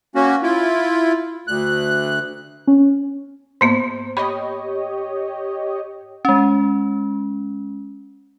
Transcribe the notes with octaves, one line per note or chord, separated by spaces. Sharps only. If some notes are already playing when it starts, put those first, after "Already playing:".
A#3 C#4 F#4
E4 F4
D2 F#6
C#4
G#2 A#3 B3 C5
G4 C#5 D#5 B5
G#3 C#4